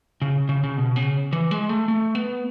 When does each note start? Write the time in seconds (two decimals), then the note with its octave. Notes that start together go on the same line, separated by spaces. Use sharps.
0.22 C#3
0.49 C#3
0.64 C#3
0.77 B2
0.96 C#3
1.33 E3
1.51 G#3
1.69 A3
1.88 A3
2.15 B3